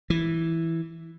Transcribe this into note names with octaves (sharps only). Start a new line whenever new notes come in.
E3